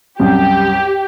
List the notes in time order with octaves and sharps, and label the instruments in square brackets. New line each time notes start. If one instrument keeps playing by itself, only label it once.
[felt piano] C2 F#2 [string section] G4